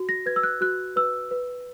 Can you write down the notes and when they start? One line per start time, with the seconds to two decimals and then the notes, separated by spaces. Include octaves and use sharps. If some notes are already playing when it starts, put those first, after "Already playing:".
Already playing: F#4
0.09 A#6
0.26 B4 G#6
0.36 E6
0.43 F#6
0.61 F#4 F#6
0.96 B4 E6
1.31 B4